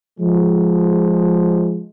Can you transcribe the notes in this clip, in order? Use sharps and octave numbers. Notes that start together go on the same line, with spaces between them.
F3 G#3